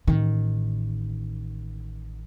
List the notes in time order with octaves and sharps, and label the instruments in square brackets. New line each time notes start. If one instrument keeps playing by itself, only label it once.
[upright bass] A1 D#3